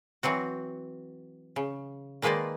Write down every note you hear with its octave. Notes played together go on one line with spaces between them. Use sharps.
E3 F#3 C4 F#4
C#3
D#3 G#3 A#3 B4 C5 D5